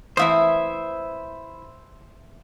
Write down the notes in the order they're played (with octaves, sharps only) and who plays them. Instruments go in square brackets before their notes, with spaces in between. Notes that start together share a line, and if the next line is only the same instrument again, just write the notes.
[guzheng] E3 A3 C4 [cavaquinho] E4 F4 D#6 [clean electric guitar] C5 E5